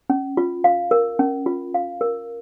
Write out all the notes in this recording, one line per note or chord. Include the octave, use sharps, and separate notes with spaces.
C#4
F4
F5
A#4
C#4
F4
F5
A#4